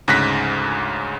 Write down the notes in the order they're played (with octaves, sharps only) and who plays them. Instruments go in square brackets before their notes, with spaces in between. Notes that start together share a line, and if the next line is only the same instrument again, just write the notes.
[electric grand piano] D2 G#2 C#3 F#6 A#6 B6